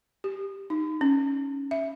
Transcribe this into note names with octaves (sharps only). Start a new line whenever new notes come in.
G4
D#4
C#4
E5